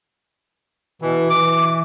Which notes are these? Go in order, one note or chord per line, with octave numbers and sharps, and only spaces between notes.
B2 E3
E3 D6